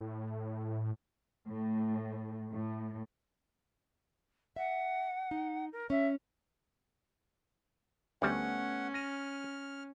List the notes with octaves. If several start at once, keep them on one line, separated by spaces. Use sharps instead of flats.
A2
A2
A2
E5 F#5
D#4
A#4
C#4 E5
D2 G3 A3 B3 C#4 F#5 G#5
F6 A#6 D#7